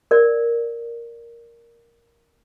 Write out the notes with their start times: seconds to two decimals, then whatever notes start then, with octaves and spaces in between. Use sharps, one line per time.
0.11 A#4 D5